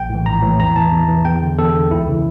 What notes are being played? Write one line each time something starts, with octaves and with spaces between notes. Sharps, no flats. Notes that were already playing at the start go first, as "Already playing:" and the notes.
Already playing: A#1 G5
A2
E3
A#1 A#5
A2 E3
E2 A#5
E3 A5
E2
E3
E2 G5
D3
E2 A4
D3
C#2 E4
C#3 E3